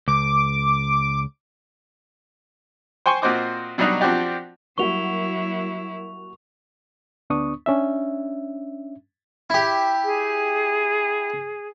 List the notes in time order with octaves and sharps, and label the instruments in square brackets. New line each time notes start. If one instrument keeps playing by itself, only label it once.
[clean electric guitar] C#2 [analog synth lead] D6
[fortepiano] C5 G5 G#5 C6 C#6
A#2 C4 F#4 C5 D#5 D6
B2 F#3 G3 D4 D#4 F#4
F3 C4 D4 F#4 G4 D5
[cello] F#3 E4 [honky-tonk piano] G3 A#3 F#4 [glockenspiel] C#6 F7
[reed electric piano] D2 B3 D4 C#6 D#6
C#4 D4 E5
[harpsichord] E4 G4
[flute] G#4